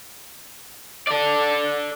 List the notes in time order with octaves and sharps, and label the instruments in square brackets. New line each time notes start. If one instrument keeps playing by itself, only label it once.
[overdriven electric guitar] A4 D5